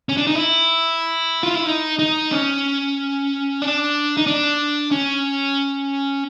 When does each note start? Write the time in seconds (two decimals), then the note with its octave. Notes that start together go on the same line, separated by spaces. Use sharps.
0.09 C#4
0.17 D4
0.27 D#4
0.35 E4
1.43 F4
1.54 E4
1.66 D#4
1.99 D#4
2.32 C#4
3.62 D4
4.17 D#4
4.27 D4
4.91 C#4